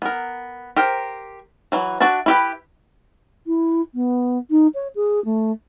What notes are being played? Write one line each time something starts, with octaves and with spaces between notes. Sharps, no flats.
B3 A#4
G4 A#4 C5
E3 F#3
D4 F#4 E5 A5
E4 G4 B4
E4
B3
D#4
C#5
G#4
A3